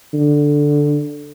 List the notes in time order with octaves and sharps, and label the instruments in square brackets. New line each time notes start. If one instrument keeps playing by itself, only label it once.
[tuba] D3